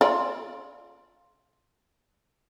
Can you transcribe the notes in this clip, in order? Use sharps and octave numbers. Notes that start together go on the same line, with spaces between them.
F4 D5